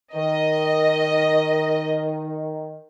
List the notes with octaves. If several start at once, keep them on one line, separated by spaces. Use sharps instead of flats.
D#3 D#5